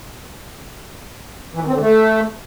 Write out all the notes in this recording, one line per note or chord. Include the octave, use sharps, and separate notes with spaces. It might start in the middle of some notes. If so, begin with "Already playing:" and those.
E3
D#3
C4
D3
A3